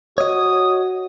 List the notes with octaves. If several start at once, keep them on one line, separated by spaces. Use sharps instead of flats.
F#4 C#5 D#5 D#6